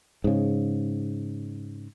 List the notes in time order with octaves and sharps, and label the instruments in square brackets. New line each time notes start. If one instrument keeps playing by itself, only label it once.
[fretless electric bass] G#2 C#3